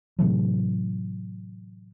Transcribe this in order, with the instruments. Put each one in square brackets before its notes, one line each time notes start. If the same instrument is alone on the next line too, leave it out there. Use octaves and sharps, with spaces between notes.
[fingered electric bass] A2 C3 E3 F#3